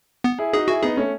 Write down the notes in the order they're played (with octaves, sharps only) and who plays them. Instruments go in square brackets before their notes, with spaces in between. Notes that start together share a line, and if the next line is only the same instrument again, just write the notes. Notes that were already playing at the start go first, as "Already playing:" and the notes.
[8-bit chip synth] B3
[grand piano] E4 G#4
[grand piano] D#4 F#4 [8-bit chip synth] G#4
[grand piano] E4 G#4 [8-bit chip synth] F#4
[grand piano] B3 D#4 [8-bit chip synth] G#4
[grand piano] A3 C#4